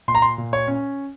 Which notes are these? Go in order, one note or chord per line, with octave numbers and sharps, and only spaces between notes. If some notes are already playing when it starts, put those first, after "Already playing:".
A#2 C6
A#5
C6
A#2
C#5
C#4